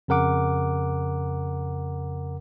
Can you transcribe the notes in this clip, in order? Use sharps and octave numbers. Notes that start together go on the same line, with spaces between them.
F2 C#3 A#4 F#5 D6